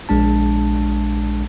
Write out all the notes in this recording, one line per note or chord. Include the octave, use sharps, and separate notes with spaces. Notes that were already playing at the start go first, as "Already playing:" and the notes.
A#1 G#3 D4 A5